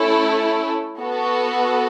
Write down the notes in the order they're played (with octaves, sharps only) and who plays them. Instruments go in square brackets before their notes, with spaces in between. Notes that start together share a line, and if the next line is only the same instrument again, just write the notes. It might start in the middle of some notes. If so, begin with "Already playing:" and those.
Already playing: [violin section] A3 C#4 E4 A4
B3 F#4 A4